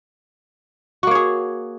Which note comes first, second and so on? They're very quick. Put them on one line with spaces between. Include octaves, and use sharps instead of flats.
F#4 A#3 C#5 G#4